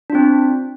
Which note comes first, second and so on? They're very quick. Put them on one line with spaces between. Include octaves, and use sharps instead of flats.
D4 F4 C4